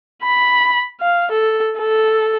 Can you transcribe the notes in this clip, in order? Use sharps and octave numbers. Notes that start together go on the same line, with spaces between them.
B5
F5
A4
A4